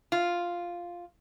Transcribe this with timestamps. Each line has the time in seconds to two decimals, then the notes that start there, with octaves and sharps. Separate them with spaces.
0.12 F4